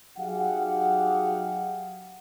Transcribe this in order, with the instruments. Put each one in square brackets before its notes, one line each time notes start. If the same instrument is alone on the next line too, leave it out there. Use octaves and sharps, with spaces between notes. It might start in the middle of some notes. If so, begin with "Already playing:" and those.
[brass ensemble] F#3 D#4 G4 G#4 F5 F#5